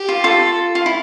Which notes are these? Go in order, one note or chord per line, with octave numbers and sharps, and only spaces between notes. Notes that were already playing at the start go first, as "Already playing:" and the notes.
Already playing: G4
F4
F4 A4
F4
E4